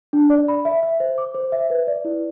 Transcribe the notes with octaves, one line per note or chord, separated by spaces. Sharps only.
D4
D5
B5
E5
E5
C5
D6
C5
E5
B4
D5
E4